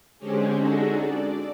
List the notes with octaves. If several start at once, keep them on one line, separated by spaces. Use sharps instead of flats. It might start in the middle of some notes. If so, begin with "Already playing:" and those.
D3 G#3 C4 C#4 G4 G#4
G#3 D4 D#4 F#4 G#4 A4
D5